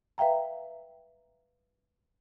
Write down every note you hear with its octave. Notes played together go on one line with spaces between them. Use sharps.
B4 E5 F5 G5 A#5